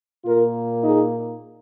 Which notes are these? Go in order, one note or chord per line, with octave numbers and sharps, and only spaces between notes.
A#2 A#3 F4 A#4
D#4 G#4